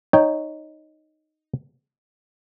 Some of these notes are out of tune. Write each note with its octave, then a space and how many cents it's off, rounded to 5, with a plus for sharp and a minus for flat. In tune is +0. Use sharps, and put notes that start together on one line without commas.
D#4 -5 C#5 +0 G5 +5